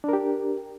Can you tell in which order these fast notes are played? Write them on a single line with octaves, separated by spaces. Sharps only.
D4 A#4 G4